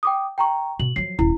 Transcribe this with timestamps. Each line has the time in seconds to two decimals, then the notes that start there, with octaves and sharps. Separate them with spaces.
0.03 G5 D6 D#6
0.38 G5 A#5 C#6
0.79 B2 F#7
0.96 F3 F#3 C7
1.19 D#1 E4